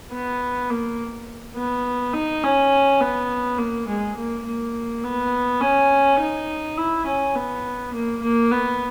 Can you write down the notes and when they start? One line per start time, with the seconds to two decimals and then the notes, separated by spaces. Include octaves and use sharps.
0.12 B3
0.70 A#3
1.56 B3
2.14 D#4
2.43 C#4
3.01 B3
3.59 A#3
3.88 G#3
4.17 A#3
4.46 A#3
5.04 B3
5.61 C#4
6.19 D#4
6.77 E4
7.06 C#4
7.36 B3
7.94 A#3
8.22 A#3
8.51 B3